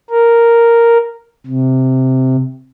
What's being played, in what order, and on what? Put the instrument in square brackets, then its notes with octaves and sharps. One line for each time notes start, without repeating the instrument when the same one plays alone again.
[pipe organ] A#4
C3